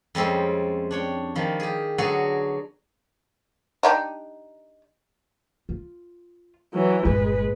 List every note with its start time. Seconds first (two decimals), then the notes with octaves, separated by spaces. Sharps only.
0.15 F2 G3 G#3 C4 C#4
0.91 D4 C#5 G5
1.35 D#3 F3 G3
1.60 G4 G#4
1.98 D3 F#3 B3 F#4 G#4 D5
3.83 D4 D#4 G4
5.69 F4
6.74 E3 F#3
7.05 G1 A#2 G#3 B4